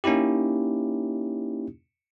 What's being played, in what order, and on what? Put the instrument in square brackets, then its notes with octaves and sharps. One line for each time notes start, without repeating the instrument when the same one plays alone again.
[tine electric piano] A#3 C#4 D#4 E4 G4